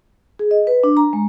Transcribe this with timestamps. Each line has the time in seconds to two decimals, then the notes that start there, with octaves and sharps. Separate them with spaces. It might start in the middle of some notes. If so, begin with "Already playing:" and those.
0.39 G#4
0.51 D#5
0.67 B4
0.84 D4
0.97 A#5
1.13 G#3